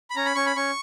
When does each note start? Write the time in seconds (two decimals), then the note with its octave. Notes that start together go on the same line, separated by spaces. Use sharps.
0.10 B5
0.16 C#4 A#5
0.25 B5
0.35 C#4 C#6
0.46 B5
0.56 C#4 C#6